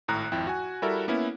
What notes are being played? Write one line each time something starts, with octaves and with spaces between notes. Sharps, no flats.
G#1 A2 A#5 F#6
G#1 F2 E4 G5
F#4 G#5
G3 E4 F#4 A4 A#4 E5
A#3 B3 C#4 E4